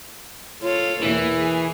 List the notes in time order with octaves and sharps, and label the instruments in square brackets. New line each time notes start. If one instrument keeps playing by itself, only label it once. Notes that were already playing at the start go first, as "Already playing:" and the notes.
[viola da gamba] F4 A4 C#5
[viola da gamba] E2 B2 A#3 [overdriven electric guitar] E3
[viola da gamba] G#4